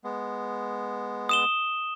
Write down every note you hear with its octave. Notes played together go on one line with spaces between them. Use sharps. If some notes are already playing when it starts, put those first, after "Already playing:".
G#3 B3
D#6 E7 G7